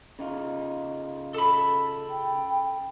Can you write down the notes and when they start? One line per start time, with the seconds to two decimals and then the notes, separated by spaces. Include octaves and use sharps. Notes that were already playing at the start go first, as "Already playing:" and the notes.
0.19 C#3 D#4 F4
1.35 A4 B5
2.10 G5